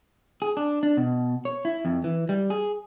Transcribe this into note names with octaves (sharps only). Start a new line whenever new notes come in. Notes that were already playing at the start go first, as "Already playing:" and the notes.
G#4
D4
D4
B2
C#5
E4
F2
E3
G3
G#4